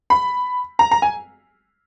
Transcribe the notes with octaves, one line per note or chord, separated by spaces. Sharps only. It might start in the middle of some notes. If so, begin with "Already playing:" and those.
B5
A#5
A#5
G#5